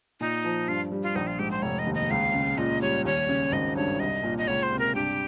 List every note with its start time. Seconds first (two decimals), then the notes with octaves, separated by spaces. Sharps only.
0.20 A#2 D#4
0.44 F3
0.68 G2 F4
0.92 G3
1.03 F4
1.15 A#1 D#4
1.27 F4
1.39 G#2 G4
1.51 C5
1.62 F1 C#5
1.79 D#5
1.86 D#2
1.94 D#5
2.10 C#2 F5
2.34 C#3
2.58 A#2 D#5
2.81 G3 C#5
3.05 D#2 C#5
3.29 C#3
3.52 G#1 D#5
3.76 G2 C#5
4.00 C2 D#5
4.23 A#2
4.38 D#5
4.48 C#2 C#5
4.63 C5
4.72 C3
4.79 A#4
4.95 G2 G4